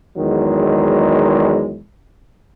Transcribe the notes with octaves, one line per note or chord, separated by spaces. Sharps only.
E2 D#3 F#3 G#3